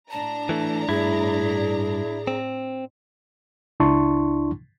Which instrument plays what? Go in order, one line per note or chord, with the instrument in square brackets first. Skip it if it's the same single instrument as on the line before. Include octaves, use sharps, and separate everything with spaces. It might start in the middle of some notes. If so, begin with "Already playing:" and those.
[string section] A2 D4 A#5 [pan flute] A5
[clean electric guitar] E3 A3
[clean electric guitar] G2 [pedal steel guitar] E4 [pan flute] G#4
[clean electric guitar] C4
[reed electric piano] C#2 D4 E4 A5 C6 C#6